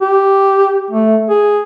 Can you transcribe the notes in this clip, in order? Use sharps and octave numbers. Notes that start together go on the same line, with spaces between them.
G4
A3
G#4